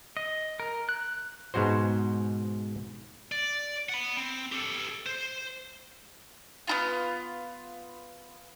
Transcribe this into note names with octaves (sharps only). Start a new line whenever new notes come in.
D#5
A#4
F#6
G#2 B2 G#3 F#4 C5
D5
F#5 B5
C4
G4 A4
C5
B3 E4 F4